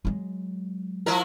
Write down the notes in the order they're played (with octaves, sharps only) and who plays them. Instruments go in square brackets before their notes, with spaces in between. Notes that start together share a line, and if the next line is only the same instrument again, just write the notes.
[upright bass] F#3 G#3
[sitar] F3 E4 A#4